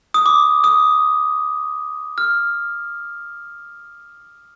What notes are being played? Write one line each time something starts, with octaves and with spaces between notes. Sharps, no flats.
D#6
D6
D#6
F6